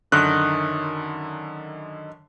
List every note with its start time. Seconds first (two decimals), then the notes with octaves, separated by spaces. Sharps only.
0.12 F#2 D3 D#3 F#6